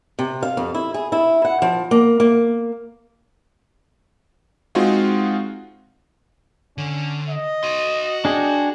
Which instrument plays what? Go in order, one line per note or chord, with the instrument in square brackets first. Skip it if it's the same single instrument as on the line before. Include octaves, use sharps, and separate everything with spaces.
[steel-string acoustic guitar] C3
F5
F2
E4
G#4
E4
F#5
F3
A#3
A#3
[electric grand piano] G#3 C4 D#4 F4 F#4 G#4
[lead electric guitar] D3 [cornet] C#4
[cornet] D#5
[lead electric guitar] F#4 C6
[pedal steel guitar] D4 G#4 G5